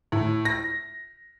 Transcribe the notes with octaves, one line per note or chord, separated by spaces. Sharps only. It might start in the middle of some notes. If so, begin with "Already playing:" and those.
A2
A#6